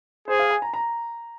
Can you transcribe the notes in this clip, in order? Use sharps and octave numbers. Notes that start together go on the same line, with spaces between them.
G#4 C5
F5
G#5
A#5
A#5